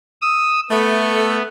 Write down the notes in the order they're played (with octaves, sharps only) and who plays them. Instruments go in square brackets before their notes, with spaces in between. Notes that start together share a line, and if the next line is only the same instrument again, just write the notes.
[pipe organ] D#6 E6
[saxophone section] A3 [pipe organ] B3